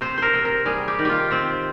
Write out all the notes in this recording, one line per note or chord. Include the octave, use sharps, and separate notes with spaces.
C3 C5
A#4 C5
C3
A#4
G3 G#4
G4
D#3
F4 G4
C3 C4